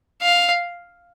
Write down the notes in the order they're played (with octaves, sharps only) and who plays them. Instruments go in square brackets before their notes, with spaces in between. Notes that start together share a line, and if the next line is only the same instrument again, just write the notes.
[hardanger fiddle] F5